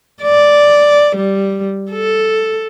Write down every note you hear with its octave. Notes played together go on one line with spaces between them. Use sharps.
D5
G3
A4